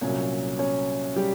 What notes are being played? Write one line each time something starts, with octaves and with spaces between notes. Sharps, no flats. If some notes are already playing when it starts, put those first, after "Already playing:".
C2 A#2 F#3 C#4 C#5
C#4 C#5
G3 G4